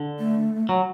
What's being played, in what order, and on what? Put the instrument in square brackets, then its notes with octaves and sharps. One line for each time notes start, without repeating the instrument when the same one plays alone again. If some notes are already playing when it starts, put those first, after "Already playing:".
Already playing: [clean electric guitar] D3
[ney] A3
[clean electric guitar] F#3